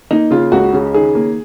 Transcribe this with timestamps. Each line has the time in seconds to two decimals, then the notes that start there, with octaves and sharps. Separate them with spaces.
0.11 A#3 D#4
0.31 C#3 F4
0.52 C#2 F#4
0.73 C#3
0.94 D#3 G#4
1.15 A#3